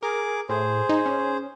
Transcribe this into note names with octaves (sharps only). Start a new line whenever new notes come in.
G#4 A#4 D6
A2 G#4 C5
D#4
C#4